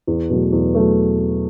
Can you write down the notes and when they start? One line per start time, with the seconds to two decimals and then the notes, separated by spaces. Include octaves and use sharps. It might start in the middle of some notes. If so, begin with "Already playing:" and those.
0.07 E2
0.30 B2 F#3 A3
0.52 E2
0.75 F#3 A3